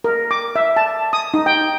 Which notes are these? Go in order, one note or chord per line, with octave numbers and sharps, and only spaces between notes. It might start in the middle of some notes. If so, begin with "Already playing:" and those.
A#4
D6
E5
A5
D#6
D#4
G5